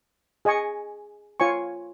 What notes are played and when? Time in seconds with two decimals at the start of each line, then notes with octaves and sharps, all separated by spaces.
0.45 G#4 D#5 G#5 C#6
1.40 F4 C#5 G#5 C#6